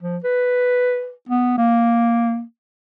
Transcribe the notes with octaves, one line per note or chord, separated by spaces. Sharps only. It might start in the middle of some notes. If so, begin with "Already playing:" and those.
F3
B4
B3
A#3